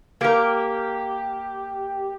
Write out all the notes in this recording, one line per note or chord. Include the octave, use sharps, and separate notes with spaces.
A#3 G4 A#4